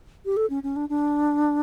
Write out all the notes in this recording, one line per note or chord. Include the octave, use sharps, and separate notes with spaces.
G4
A4
C#4
C#4
D4
D4